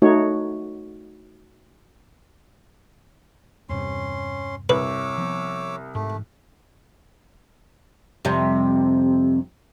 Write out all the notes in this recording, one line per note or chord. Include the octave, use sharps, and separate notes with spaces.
A3 D#4 F#4 C#5
E2 G2 C3 C#4 C6
C2 B4 C#5 D6 E6
F3 B3
G#2 A3
F2 C3 G3